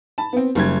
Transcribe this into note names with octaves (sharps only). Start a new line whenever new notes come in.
A5 B5
B3 C4
F#1 G3 G#6